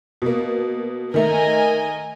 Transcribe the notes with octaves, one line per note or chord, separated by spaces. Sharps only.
B2 A#3
D#3 A3 A#4 D#5 G#5